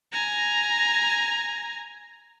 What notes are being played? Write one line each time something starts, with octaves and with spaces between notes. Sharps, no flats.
G#5 A#5